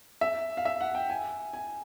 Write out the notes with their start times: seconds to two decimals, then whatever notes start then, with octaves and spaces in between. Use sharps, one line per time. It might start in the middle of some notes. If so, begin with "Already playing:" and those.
0.21 E5
0.57 F5
0.65 E5
0.81 F#5
0.95 G5
1.10 G#5
1.53 G#5